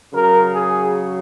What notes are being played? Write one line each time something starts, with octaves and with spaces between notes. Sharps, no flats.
C#3 F#3 A#4
G#4